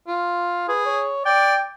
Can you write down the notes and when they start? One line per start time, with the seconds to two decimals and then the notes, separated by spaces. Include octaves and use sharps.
0.08 F4
0.68 G#4 B4
0.86 C#5
1.25 D5 G5